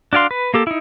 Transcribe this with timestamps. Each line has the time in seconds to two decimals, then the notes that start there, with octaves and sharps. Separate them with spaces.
0.13 D4 F#4 D5 F5 C6
0.31 B4
0.54 A#3 G4 A4
0.67 D#4 E4